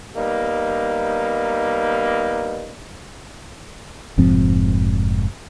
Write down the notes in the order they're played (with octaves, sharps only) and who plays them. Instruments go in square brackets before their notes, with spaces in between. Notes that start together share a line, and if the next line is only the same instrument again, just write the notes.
[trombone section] G3 A#3 B3 D#4
[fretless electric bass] F1 G#2 F3 C4